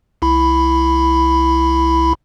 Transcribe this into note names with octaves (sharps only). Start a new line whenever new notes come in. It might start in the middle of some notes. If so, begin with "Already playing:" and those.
C2 E4 B5